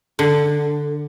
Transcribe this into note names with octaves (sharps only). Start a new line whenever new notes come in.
D3